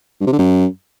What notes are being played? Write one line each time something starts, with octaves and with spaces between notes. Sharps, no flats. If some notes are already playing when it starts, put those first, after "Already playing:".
G2
C3
D3
F#2